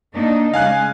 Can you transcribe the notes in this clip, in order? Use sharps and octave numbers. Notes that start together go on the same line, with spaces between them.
A#3 D4 D#4
C#3 G#3 F5 G#5 F#6